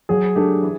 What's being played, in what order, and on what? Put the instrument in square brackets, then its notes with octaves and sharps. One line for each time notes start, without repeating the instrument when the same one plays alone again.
[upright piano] F#3 [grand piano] G#4
[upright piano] A3 D4 G4
E3